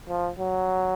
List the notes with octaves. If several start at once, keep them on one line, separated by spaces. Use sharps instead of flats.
F3
F#3